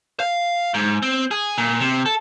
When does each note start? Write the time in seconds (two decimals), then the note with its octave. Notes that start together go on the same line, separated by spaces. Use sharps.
0.20 F5
0.74 G#2
1.02 C4
1.31 G#4
1.58 A#2
1.80 C3
2.06 A4